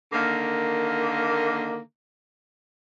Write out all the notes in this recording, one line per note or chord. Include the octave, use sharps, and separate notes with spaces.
D3 D#3 A#3